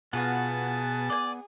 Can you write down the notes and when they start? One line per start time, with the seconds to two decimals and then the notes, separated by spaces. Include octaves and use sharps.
0.13 B2 B3 F4 F#4 G#4 A5
1.10 D5 G#5